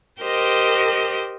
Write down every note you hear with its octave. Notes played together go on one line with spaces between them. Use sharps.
G4 A#4 C5 D#5